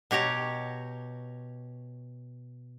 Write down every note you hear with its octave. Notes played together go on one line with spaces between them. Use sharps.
B2 G4 C#5 A#5